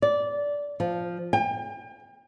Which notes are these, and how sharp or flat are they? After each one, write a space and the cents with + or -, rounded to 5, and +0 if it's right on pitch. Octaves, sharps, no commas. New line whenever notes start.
D5 -15
F3 +0
G5 +40